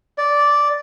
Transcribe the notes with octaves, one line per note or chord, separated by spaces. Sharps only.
D5